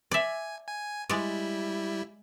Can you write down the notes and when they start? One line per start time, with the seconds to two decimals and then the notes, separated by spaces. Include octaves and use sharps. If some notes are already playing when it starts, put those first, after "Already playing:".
0.11 D5 E5 G#5
0.67 G#5
1.09 G3 G#3 E4 D5